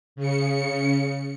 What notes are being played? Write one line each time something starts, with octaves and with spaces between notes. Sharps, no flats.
C#3 C#7